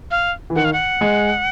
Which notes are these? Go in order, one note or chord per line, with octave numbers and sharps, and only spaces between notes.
F5
E3
D#3 F#5
F5
F#5
G#3